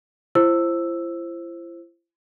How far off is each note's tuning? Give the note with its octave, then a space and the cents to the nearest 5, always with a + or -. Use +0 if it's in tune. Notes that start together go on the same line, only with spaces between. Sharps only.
E4 +45 C5 +10 E6 +0